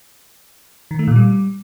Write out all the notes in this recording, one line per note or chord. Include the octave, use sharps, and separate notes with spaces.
D#3
A3
A#2
G3